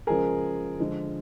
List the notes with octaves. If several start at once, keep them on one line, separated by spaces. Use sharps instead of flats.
C#3 F3 G#3 G#4 A#4
D3 F3 G#3